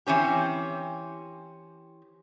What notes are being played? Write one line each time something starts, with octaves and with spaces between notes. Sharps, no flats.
E3 C4 C#4 G4